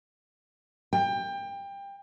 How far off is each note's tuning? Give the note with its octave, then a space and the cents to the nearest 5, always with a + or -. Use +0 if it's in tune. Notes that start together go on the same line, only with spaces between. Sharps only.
G5 +25